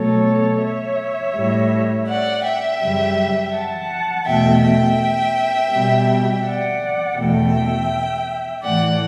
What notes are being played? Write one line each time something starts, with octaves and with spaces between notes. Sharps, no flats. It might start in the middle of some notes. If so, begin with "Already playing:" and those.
Already playing: B2 F#3 A3 A4 C#5
C#5 E5
A2 G3
D5 F#5
E5 G5
F#2 C#3 G3
F#5 A5
E2 B2 A3 E5 G5
E5 G5
B2 G3
D5 F#5
E2 B2 A3 E5 G5
A2 E3 A3 D5 F#5